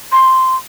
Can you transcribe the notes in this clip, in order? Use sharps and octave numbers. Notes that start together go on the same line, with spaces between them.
C6